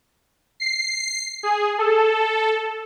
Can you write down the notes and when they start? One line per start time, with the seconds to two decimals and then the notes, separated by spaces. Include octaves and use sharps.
0.60 C7
1.43 G#4
1.78 A4